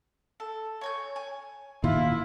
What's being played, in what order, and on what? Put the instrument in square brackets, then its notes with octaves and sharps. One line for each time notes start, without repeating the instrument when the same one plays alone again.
[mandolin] A4
C#5 G#5 G6
G#5
[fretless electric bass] A#2 D#3 [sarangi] E4 [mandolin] F4